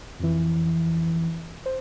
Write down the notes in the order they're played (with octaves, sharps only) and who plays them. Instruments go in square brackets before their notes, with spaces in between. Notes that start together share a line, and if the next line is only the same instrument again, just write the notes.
[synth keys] F2 E3
C5